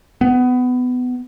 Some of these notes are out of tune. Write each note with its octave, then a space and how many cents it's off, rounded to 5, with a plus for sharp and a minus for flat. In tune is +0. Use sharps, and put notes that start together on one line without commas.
B3 +20